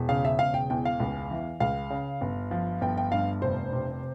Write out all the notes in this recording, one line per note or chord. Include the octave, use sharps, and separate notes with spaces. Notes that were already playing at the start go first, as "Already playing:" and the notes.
Already playing: E1
C#3 F5
E5
E1 F5
G5
E2 G5
F5
C#2
E3
C#2 F5
C#3
G1
F3
G1 G5
G5
G2 F5
F1 C5
C3